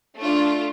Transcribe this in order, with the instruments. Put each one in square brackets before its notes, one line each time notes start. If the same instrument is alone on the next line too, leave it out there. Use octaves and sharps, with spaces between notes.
[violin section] A3 D4 F4